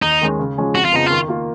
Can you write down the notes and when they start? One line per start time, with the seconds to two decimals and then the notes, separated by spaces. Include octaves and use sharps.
0.02 D#2 D#4
0.21 D#3 G#3 C#4
0.39 C#3
0.57 F3 G#3 C#4 G#4
0.75 F2 F#4
0.85 F4
0.92 C#3 F3 B3 D#4
1.06 D#3 F4
1.28 A#3 F4